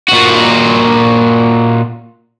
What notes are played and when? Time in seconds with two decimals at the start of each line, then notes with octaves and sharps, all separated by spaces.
0.08 A#2 F#4